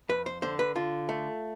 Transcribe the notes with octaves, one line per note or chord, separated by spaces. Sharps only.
F2 B4
C5
D3 C5
B4
D3 F4
A3